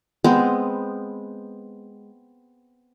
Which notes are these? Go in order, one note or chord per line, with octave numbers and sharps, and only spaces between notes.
G#3 B3 C4